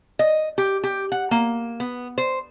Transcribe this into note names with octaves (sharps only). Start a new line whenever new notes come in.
D#5
G4
G4
F#5
A#3
B3
C5